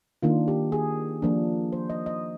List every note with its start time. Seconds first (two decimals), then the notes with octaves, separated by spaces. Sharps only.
0.23 D#3 A#3 D4 F4
0.48 G4
0.72 G#4
1.22 F3 A#3 D4
1.72 C5
1.90 D#5
2.06 D#5